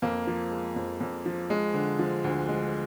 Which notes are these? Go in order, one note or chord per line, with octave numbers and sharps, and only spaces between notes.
F2 A#3
F3
G#3
F2
F2
F3
G#3
D3
F3
D2
G#3